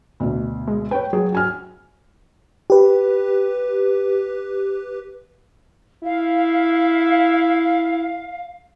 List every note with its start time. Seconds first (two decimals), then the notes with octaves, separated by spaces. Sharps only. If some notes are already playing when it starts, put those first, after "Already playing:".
0.20 D2 B2 D3
0.68 G#3
0.91 B4 C#5 G5
1.13 F#3 G#4
1.32 F#4 G#5 F6
2.70 G4 B4
6.04 E4 F5